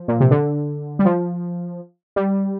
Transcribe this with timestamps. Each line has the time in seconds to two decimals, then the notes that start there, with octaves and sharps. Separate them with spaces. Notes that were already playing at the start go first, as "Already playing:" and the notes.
Already playing: F3
0.08 A#2
0.20 C3
0.31 D3
0.99 G3
1.05 F3
2.16 G3